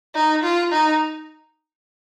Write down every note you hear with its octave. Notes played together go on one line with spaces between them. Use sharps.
D#4
F4
D#4